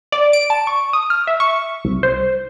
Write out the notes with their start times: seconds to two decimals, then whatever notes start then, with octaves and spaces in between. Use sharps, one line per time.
0.12 D5
0.33 D7
0.50 A5
0.67 C#6
0.93 D#6
1.10 F6
1.27 E5
1.40 C#6
1.84 C2
2.03 C5